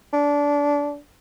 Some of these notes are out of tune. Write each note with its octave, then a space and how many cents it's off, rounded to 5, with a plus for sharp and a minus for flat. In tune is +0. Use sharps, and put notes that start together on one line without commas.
D4 -20